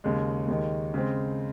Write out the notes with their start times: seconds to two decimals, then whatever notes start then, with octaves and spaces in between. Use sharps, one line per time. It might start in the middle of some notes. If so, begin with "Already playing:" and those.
0.04 D#2 C#3 G#3
0.48 D#2 D#3 G#3
0.94 C#3 G#3 C4